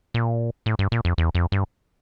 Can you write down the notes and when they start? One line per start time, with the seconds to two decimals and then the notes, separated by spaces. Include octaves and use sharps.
0.14 A#2
0.66 A2
0.79 G2
0.92 A#2
1.05 F2
1.18 E2
1.35 F2
1.52 G2